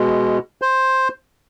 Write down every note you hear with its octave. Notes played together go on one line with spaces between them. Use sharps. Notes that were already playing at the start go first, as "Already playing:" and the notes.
Already playing: B2 G#3
C5